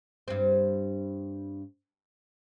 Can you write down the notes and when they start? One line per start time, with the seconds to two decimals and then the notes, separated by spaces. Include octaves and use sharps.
0.28 G2 C4